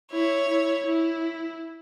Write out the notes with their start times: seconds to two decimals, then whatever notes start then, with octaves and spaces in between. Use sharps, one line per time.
0.12 E4 C#5
0.48 E4
0.86 E4